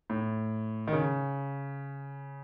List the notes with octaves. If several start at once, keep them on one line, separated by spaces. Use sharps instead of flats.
A2
D#3
C#3